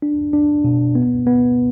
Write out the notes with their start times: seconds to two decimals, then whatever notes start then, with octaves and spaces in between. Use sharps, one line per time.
0.02 D4
0.33 D4
0.64 B2
0.95 B3
1.26 B3